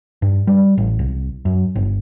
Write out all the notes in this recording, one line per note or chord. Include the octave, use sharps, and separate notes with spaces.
G2
G3
A1
C2
F#2
G1